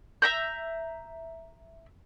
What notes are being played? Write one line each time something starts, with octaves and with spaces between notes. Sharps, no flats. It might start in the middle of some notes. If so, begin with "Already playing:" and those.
E5 A#5 G6